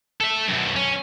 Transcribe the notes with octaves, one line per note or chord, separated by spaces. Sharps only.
A4 E5
F#2 B2
C#4